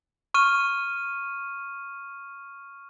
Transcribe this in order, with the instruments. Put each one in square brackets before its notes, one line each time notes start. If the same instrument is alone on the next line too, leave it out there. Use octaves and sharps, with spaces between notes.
[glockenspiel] C#6 F6 D#7